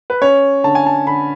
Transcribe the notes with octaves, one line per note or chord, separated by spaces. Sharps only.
B4
C#4 C#5
D3 A5
G#5
A5
D3 B5